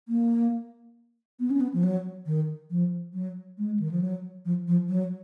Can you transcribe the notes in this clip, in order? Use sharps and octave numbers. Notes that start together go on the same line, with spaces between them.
A#3
B3
C#4
B3
F3
F#3
D#3
F3
F#3
G#3
D#3
F3
F#3
F3
F3
F#3